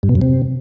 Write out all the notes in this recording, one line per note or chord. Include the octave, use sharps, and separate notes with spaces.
G2
B2
F#2
C3